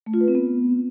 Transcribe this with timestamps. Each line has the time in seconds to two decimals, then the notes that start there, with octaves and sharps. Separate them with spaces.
0.06 A3
0.14 F4
0.21 B4
0.28 C4
0.35 B3